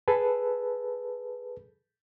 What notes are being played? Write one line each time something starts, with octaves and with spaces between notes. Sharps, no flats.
G#4 A4 B4